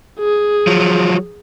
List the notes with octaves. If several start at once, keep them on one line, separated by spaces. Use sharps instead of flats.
G#4
F3 F#3